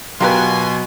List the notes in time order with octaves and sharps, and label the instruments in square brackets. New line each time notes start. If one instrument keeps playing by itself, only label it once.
[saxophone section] B2 [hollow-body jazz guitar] F#3 G4 [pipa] F4 A#4 B4 [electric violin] G#5 C6